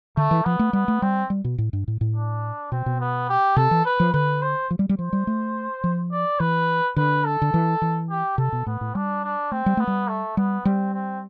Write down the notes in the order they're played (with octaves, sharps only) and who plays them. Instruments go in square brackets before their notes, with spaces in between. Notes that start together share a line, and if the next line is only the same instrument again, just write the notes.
[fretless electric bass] D3 [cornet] A3
[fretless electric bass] E3
[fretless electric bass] F3 [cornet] B3
[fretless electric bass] A3
[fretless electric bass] G3 [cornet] B3
[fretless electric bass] A3
[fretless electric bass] G3 [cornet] C4
[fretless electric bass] G3
B2
A2
G2
A2
A2
[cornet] D4
[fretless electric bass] B2 [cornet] C4
[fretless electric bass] B2
[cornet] B3
G4
[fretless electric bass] C3 [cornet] A4
[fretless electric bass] E3
[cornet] B4
[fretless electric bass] F3
[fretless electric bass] D3 [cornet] B4
[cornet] C5
[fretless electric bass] F3
G3
G3
[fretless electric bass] F3 [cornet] C5
[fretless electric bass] G3
A3
F3
[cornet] D5
[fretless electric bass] E3 [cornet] B4
[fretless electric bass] D3 [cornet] B4
[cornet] A4
[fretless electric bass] D3
E3
E3
[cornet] G4
[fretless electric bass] C3 [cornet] A4
[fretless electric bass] B2
[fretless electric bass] A2 [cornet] B3
[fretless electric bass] A2
[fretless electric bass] G3 [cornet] D4
[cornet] D4
[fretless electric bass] A3 [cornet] C4
[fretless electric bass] G3
[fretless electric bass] A3 [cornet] B3
[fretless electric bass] G3
[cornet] A3
[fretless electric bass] G3 [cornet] B3
[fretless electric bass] G3 [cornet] C4
[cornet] C4